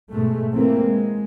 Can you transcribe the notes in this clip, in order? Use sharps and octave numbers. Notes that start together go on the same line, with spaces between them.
G#2 B2 G#3 A3
E3 A3 A#3 C4
G#3